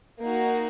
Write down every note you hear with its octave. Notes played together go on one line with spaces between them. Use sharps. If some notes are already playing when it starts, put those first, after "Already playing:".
A#3 D#4 F#4